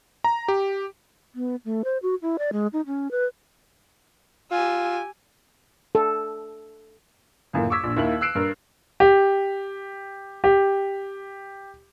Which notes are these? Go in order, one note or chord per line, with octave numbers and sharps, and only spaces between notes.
A#5
G4
B3
A3
C5
F#4
E4
D5
G#3
D#4
C#4
B4
F4 G4 G#5 E6
A4
C#2 F#2 A2 A#3
C#6 D6 E6 G#6 B6
A#1 D4
D#2 D#3 E4 F5 F#7
E6 F#6 C7 D7 E7
G2 A#4
G4
G4